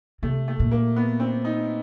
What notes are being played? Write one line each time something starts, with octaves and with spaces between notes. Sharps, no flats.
C3 A3
A3
A#2
A#3
B3
C4
D#4